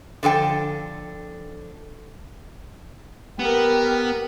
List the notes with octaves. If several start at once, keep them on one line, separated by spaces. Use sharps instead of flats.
D3 F3 A4 G5
B3 G4 A#4